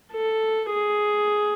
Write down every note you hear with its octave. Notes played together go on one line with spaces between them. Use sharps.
A4
G#4